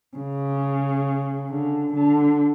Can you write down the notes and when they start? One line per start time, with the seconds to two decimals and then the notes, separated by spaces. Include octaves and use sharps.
0.17 C#3
1.50 D3
1.94 D3